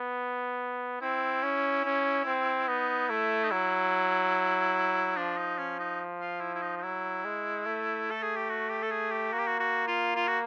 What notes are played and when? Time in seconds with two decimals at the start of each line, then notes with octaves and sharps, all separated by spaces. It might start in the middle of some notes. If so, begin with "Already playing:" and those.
Already playing: B3
1.01 C4 E4
1.43 C#4
1.85 C#4
2.25 C4
2.68 B3 D#4
3.09 A3 E4
3.43 D#4
3.50 F#3 E4
5.17 F3 D4
5.37 D#4
5.59 C#4
5.79 D#4
6.21 F4
6.41 E4
6.55 E4
6.62 D#4
6.77 D#4
6.82 F#3 E4
7.24 G#3
7.66 A3
8.11 A4
8.23 G#4
8.36 G4
8.50 F#4
8.70 G4
8.83 A4
8.91 G#4
9.11 G4
9.33 A#3 F#4
9.39 G4
9.47 F#4
9.60 F#4
9.88 F4
10.16 F4
10.27 F#4